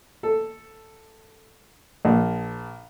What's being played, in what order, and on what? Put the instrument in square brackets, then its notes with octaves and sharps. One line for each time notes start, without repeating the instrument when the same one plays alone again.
[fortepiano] A4
A#1